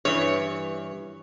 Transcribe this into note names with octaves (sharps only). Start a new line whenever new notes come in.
G2 E3 C#5